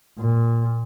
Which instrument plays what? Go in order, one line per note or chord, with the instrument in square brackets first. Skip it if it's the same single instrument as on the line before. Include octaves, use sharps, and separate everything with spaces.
[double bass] A#2